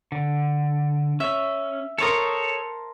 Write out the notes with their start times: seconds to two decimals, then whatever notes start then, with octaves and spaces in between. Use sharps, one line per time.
0.12 D3
1.20 C#4 E5
1.98 A4 A#4 C5 C#5 A5 D#6